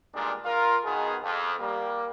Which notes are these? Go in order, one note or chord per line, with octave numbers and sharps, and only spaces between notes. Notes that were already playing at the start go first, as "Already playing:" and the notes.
G2 A#2 D#3 G#3 D4
F4 A#4
B2 D#3 B3 G#4
F2
G3 A#3